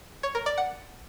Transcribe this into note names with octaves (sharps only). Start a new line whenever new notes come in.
C#5
A#4
D5
F#5